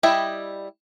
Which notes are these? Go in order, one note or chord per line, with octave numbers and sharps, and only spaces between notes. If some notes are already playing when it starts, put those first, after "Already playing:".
G3 E4 D#5 E5 G5